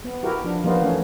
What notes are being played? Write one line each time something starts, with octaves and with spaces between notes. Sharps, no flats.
B3
E4 F#4 G4 A#4
F3 D4
F3 G3 A#3 B3 D#4 F4
E3 A3 C#4